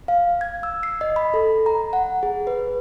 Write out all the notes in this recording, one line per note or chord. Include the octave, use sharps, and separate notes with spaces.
F5
G#6
E6
C7
D#5
B5
A4
A#5
F#5
G#4
B4